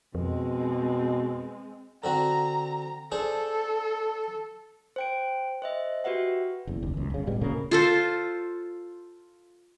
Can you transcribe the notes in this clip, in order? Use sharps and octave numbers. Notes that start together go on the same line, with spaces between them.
F2 B2 G#3 C4
D3 C4 F#4 A#5
D4 G#4 A4 C5
C5 G5 D7
C5 D#5 E5
F#4 G4 B4 E5 F#5
F#1 E2
F#1 D#2
C#2
G1 C#3
A2 G3 G#3 B3
D2 A#2 C#3 A#3
F4 A4 C5